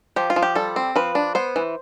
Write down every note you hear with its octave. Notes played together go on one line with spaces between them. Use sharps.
F3 G4
F4
F3
G4
G3 A4
C4
F3 B4
D4
B3 C5
E3